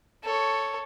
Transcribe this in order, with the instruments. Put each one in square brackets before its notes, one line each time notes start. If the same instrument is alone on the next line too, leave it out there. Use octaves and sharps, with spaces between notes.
[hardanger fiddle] A4 C#5